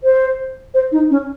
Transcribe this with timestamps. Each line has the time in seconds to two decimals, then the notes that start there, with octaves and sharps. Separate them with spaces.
0.04 C5
0.74 C5
0.92 D#4
1.10 C#4